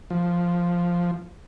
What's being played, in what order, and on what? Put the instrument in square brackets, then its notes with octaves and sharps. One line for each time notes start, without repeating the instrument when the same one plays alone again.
[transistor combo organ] F3